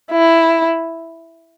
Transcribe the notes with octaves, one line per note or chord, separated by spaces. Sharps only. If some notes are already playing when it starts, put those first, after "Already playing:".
E4